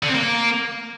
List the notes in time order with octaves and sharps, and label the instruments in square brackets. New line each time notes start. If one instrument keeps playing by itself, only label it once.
[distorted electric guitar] D3
C4
A#3